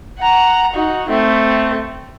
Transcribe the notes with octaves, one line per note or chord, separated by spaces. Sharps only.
F#5 A#5
D#4 F#4
A3 C4